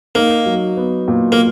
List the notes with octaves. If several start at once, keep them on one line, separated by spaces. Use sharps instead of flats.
A#3 D#4
F#3
B3
A#2
A#3